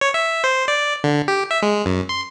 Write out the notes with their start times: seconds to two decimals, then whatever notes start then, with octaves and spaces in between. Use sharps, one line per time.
0.01 C#5
0.14 E5
0.44 C5
0.68 D5
1.04 D3
1.28 G4
1.51 E5
1.62 G#3
1.86 F#2
2.09 C6